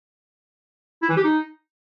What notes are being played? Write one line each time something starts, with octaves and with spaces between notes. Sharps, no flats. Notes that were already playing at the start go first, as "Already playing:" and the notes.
E4
E3
G4
D#4